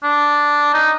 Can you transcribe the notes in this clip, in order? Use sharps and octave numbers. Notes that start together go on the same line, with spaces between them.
D4
D#4